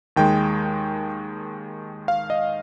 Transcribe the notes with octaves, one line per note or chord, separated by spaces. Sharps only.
D#2 D#3 G#3 G5
F5
D#5